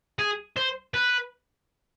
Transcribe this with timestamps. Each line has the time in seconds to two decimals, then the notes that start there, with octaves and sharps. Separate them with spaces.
0.19 G#4
0.57 C5
0.94 B4